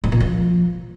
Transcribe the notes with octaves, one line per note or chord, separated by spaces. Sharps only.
G#2
A#2
F3